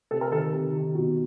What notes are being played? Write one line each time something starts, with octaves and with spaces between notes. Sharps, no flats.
C3 A4
A#4
D#3 A4
C3
D#3
B2